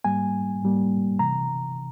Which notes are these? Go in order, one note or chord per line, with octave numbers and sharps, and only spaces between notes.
G#2 G3 A#3 G#5
G#2 G3 A#3
C3 E3 A#5